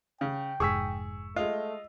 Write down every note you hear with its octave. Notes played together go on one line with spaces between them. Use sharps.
C#3 G5
F1 G#2 G#4 C#6 E6 B6
G#3 A3 F4 D#5